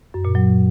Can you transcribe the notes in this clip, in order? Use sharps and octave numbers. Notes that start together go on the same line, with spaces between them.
F#2
A#2
F#3